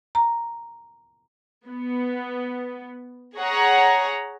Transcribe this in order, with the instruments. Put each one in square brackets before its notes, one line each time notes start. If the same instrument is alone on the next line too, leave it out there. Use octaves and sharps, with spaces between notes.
[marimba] A#5
[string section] B3
G#4 C#5 F#5 A#5